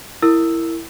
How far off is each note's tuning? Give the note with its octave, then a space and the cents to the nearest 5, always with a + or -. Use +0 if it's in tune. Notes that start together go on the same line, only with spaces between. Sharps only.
E4 +5 A#4 -20 E6 +0